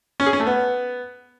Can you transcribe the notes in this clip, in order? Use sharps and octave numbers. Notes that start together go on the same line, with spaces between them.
C#4
G#4
C#4
A3
B3